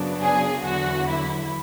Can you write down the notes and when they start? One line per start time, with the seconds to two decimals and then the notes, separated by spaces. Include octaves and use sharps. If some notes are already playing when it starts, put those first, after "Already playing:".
Already playing: F#2 C#3 F#3 B3 D4
0.21 G#4
0.64 E2 D3 F#3 F#4
1.07 E4